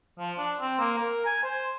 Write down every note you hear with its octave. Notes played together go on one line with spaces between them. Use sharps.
F3
D4
C4
A#3
A#4
G#5
C5